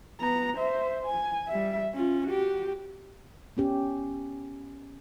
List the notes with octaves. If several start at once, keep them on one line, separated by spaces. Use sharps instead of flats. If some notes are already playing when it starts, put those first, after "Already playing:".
B3 A#5
C5 E5
G#5
G3 E5
C#4 F4
F#4 G4
B3 C#4 G4